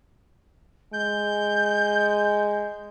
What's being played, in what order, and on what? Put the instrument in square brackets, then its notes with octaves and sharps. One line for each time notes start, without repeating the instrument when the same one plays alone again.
[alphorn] G#3 [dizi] G6